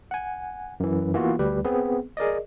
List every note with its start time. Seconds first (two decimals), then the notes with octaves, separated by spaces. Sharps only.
0.11 F#5 G#5
0.80 F#2 E3
1.14 E3 A#3 B3 F4 F#4
1.39 D2 G3 G4 B4
1.65 B3 C4 G#4 B4
2.17 G#4 A#4 D5 D#5